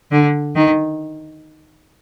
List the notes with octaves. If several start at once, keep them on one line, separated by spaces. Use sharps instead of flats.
D3
D#3